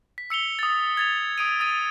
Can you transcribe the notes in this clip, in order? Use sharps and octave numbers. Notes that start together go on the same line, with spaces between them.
B6
E6 C#7 F7 G7
D#6 A6
G#6 A6 F7
D#6 D7 D#7
D#6 A6 D#7